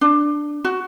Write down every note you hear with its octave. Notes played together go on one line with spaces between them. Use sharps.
D4
F#4